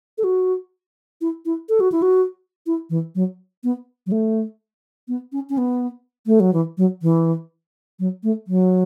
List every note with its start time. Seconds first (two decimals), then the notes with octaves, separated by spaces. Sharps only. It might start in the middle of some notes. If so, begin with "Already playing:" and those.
0.18 A4
0.24 F#4
1.21 E4
1.46 E4
1.69 A4
1.80 F#4
1.92 E4
2.02 F#4
2.67 E4
2.90 E3
3.15 F#3
3.64 B3
4.07 F#3
4.12 A3
5.08 B3
5.32 C#4
5.50 C#4
5.58 B3
6.26 A3
6.40 F#3
6.53 E3
6.78 F#3
7.02 E3
8.00 F#3
8.23 A3
8.48 F#3